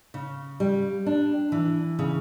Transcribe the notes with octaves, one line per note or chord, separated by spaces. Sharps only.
C#3
G3
D4
E3
C#3